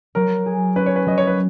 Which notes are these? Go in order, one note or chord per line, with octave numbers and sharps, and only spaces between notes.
F#3 A#4
G#4
C#4 B4
C#5
B4
F#3 D#5
C#5
B4